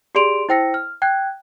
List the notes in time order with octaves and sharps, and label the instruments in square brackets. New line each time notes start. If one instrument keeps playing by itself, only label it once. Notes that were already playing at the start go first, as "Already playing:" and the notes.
[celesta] G4 G#4 D5 C6 D7 F7
E4 C5 G5 E6 A#6 C#7
F6
G5 F#6 G#6